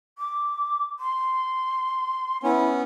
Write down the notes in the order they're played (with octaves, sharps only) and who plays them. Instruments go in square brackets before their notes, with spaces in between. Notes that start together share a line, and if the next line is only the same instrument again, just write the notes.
[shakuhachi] D6
C6
[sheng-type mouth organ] B3 C#4 [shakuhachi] E4